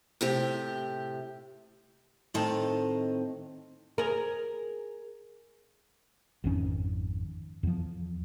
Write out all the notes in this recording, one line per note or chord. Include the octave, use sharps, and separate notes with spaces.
A2 C3 G4
A2 D#3 C4 D#5 A5 A#5
G#4 A#4
G#1 F2 D#3 C#4
E2 F3